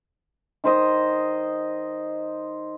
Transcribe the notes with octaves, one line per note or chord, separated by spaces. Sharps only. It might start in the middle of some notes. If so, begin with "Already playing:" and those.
D#3 C5 D#5